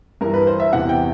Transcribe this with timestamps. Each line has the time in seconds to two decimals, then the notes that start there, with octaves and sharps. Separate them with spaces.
0.21 G2 E3 A#4
0.34 B4
0.47 C5
0.60 E5
0.73 E2 C3 E3 F#5
0.89 G5